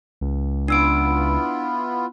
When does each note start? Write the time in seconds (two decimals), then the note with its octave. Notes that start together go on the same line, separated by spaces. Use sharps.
0.21 C#2
0.68 B3 D4 E4 F4 E6 D7